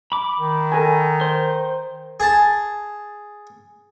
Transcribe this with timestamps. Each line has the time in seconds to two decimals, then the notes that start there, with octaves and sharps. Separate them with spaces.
0.12 B5 D6
0.38 D#3
0.72 A4 A#4 G#5
1.21 C5
2.20 G#4 A5